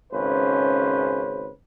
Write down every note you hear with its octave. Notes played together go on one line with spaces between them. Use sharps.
G#1 C#3 C#4 B4 C5